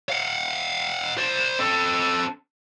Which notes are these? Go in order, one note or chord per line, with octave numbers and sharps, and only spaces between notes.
F5 F#5
C5 D5
C4 A4